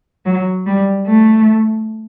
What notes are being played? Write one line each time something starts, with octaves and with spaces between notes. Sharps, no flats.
F#3
G3
A3